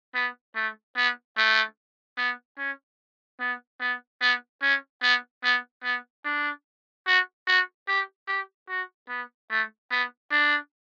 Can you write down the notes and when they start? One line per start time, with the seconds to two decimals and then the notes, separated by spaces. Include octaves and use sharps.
0.15 B3
0.56 A3
0.96 B3
1.37 A3
2.18 B3
2.58 C#4
3.40 B3
3.81 B3
4.21 B3
4.62 C#4
5.02 B3
5.44 B3
5.84 B3
6.25 D4
7.07 F#4
7.47 F#4
7.88 G4
8.28 G4
8.69 F#4
9.09 B3
9.50 A3
9.91 B3
10.31 D4